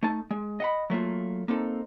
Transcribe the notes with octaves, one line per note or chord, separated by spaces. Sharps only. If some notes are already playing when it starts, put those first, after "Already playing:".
A3 D#4 A5
G#3
D#5 F#5 B5
F#3 A3 A#3 F4
A#3 C4 D#4 A4